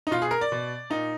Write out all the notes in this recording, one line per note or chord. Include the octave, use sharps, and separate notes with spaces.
D#4
B2 F4
G#4
A#4
D5
B2
A#2 D#4